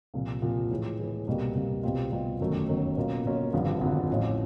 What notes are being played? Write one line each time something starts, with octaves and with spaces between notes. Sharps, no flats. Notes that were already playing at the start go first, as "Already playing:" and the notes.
C2 A#2 F3
C2 A#2 F3
A2 E3 G#3
A2 E3 G#3
C2 B2 G3 A#3
C2 B2 G3 A#3
C2 B2 G3 C4 F4
C2 B2 G3 C4 F4
G1 F#2 D#3 F#3 A3
G1 F#2 D#3 F#3 A3
B2 F#3 A#3 C#4 F4
B2 F#3 A#3 C#4 F4
G#1 G2 D3 F3
G#1 G2 D3 F3
A1 A2 F3